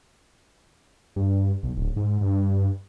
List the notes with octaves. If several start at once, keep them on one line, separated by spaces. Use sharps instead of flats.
G2
B1
D1
G#2
G2